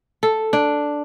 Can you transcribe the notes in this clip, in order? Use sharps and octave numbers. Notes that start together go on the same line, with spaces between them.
A4
D4